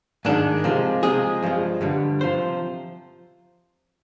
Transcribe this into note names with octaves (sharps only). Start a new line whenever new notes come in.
G#2 D#3 G#3 D4
C3 F3 G#3
C3 F3 G#3 G#4
G2 F3 G#3
G2 D3 G3
C3 F3 C5